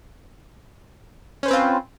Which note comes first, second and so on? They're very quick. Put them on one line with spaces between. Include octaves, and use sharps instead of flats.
C#4 C5 B4 C4 F4